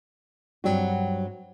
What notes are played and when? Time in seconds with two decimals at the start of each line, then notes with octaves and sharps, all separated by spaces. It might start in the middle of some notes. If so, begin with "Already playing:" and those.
0.64 G2 F#3 G3 C4 F#4